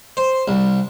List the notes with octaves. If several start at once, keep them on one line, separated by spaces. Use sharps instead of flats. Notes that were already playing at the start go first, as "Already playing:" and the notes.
C5
C2